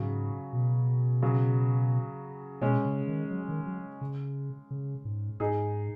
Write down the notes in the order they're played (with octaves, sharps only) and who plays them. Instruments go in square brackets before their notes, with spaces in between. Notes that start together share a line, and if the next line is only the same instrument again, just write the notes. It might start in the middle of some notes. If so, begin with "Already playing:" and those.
Already playing: [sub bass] G#2 [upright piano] C#3 F#3
[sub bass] B2
[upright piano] C#3 F#3
[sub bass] B2 [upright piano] G#3 C#4
[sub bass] C#3
D#3
F#3
D#3
F#3
C#3
C#3
G#2
[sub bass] G#2 [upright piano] D#4 G#4